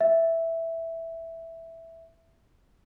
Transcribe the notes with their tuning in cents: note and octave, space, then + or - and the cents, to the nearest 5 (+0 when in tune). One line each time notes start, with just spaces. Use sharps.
E5 +0